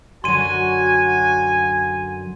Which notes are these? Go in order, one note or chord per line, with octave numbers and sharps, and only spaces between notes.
F#2 D3 F#3 F#4 G#5 C6 D#7